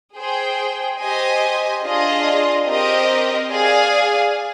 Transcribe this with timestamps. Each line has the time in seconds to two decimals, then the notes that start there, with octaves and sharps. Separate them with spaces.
0.16 G#4 C5 G5
1.00 G4 C5 D#5 G#5
1.84 D4 F4 G#4 D#5
2.67 C4 G4 A#4 D#5
3.51 G#4 D5 F5 G#5